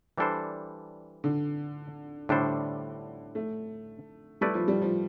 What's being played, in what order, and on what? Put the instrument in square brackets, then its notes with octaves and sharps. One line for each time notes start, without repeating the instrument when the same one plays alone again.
[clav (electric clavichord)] E3 G3 D4 A4 C5
[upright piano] D3
[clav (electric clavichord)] A2 G3 D4 A4 C5 [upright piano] D3
[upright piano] A3
[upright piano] G3 [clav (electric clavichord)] A3 E4 B4 D5
[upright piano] F3
G3
F3